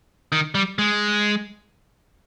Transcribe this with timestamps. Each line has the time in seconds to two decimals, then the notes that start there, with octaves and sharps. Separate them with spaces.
0.32 D#3
0.55 G3
0.79 G#3